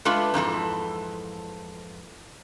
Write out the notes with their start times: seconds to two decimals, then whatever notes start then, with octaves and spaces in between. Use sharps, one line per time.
0.05 G#3 A3 D4 F4 B4
0.34 F2 G#2 E3 A4